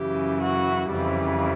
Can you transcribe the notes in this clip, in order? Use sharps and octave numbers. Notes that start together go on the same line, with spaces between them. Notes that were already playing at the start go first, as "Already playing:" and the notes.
Already playing: F#2 C#3 E3 G4
F#4
F2 C#3 E3 G3